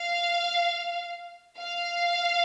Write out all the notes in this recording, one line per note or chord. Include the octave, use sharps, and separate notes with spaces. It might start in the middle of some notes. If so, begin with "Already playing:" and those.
Already playing: F5
F5